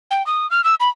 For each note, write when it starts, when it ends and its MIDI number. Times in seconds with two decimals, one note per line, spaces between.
0.11 0.25 79
0.26 0.49 87
0.51 0.63 89
0.64 0.75 88
0.80 0.89 83